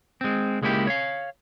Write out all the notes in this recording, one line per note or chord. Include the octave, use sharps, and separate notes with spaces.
G#3 C4
C#2 G#3 A#3 C#4 E4 G4
C#5 F5